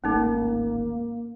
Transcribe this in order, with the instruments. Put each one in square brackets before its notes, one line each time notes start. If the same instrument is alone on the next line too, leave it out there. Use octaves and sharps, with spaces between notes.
[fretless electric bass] D1 G#1 A3 [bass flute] A#3 [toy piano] C#4 D#4 A4